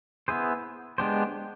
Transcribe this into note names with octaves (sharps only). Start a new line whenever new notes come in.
B3 E4 G#4 C5
G#3 B3 D4 G4 C5